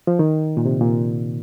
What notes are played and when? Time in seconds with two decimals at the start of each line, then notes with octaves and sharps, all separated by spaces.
0.07 F3
0.19 D#3
0.57 A#2
0.66 C3
0.81 A#2